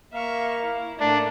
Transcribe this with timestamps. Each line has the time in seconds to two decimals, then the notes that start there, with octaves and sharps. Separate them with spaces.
0.14 A#3 E5 F5 C#6
0.63 E4
1.00 A2 A3 A#3 D4 D5